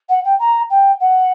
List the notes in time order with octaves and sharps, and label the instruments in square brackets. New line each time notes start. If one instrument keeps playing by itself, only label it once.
[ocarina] F#5
G5
A#5
G5
F#5